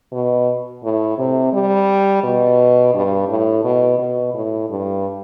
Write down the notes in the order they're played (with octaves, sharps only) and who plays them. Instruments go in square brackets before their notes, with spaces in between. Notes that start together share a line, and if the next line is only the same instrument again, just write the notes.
[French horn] B2
A2
C3
G3
B2
G2
A2
B2
B2
A2
G2